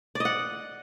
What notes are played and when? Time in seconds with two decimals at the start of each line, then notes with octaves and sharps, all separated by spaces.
0.15 D5
0.20 D#5
0.25 F#5